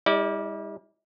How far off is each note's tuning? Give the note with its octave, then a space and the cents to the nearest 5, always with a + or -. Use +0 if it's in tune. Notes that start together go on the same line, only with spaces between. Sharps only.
G3 +40 E4 -40 D5 +0